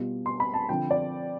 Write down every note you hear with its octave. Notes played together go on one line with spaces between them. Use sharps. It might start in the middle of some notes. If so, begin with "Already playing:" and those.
Already playing: B2 G3 B3 F4
C6
B5
A5
D3 F3 C4 G5
D5